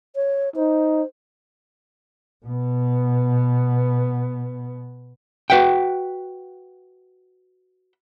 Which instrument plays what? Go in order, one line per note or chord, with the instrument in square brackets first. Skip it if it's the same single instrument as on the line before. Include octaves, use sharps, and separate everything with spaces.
[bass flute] C#5
[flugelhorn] D#4 [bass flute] C5
[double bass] B2 B3
[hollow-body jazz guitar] F#4 B4 E5 F#5 G5